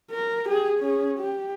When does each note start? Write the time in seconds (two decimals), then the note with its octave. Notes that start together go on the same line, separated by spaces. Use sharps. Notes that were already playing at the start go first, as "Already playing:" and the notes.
0.11 A#4
0.46 G4 G#4
0.80 C#4 G#4
1.19 G4